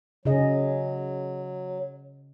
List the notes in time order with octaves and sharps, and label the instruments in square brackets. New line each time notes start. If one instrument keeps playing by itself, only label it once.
[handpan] C#3 G#4 D#5 [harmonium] F#3